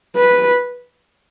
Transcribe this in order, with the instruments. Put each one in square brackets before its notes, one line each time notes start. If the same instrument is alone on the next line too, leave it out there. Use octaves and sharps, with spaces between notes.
[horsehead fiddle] B4